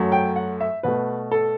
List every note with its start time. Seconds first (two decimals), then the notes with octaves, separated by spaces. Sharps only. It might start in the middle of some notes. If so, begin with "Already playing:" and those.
Already playing: F#2 F#3 A3
0.12 G5
0.36 F#5
0.60 E5
0.83 B2 A3 B4
1.31 A4